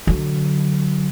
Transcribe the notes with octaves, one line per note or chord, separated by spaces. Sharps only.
D3 F#3